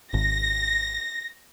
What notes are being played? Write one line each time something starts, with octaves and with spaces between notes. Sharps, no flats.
G#1 A#6